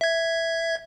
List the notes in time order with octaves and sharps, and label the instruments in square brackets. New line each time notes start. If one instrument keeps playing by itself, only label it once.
[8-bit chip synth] E5 G#6